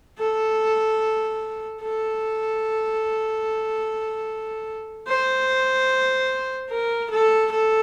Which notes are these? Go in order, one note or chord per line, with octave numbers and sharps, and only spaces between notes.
A4
A4
C5
A#4
A4
A4